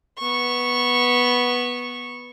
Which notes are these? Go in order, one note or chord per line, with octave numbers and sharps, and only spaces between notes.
B3 C#6